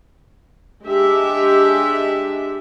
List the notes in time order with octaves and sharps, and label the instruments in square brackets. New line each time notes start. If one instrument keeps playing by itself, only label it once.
[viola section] G#3 D4 G4 E5